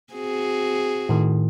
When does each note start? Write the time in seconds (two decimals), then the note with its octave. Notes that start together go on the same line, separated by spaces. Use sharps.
0.14 C4 F#4 G#4
1.09 A2 D#3